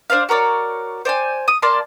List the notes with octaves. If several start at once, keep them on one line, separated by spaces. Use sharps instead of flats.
D4 C5 D5 F5
F#4 A#4 C#5 D5
C5 D5 G5 G#5
D#6
A#3 D5 A5 C6